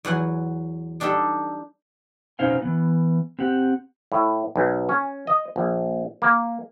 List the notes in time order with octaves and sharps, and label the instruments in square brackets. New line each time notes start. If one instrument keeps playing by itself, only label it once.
[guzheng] E2 F#3 F#5 G#5
G3 D4 D#4 G4 A4
[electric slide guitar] B2 C#4 D#4 C5 F5 G#5
E3 B3
C4 G4 F#5
[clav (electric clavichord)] A2
B1
C#4
D#5
A#1
A#3